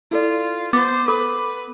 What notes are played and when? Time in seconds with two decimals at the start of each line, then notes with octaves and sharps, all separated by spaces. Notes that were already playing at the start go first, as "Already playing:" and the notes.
0.11 E4 F4 A4 D5
0.73 B3 C5 D6 A6
1.08 A4 B4 B5 D6